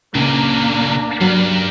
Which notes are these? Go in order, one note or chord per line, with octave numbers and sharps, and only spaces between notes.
C#2 A#2 C#3 A#3 D4 A#5
G2 F#3 A#4 D5